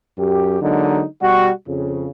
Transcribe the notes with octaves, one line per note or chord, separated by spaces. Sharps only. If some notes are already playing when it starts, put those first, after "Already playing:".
F#2 G4
D3 F#3 G#3 A#3 D#4
B2 G3 F#4
F2 C#3